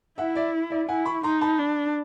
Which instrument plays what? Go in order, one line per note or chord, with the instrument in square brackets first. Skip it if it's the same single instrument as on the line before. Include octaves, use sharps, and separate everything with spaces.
[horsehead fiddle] E4 [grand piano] E5 F#5
[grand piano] D5 E5
D5 E5
[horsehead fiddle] E4 [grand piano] F#5 G#5
[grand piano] B5 C#6
[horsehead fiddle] D#4 [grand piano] A#5 C6
[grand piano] A5 B5
[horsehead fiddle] D4